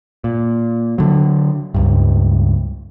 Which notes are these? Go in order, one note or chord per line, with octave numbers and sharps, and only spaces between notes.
A#2
D3 F#3
C#2 G2